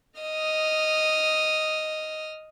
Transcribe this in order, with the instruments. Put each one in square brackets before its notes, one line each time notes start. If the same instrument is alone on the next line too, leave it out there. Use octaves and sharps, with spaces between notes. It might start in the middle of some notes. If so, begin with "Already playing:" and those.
[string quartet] D#5 D#6 F6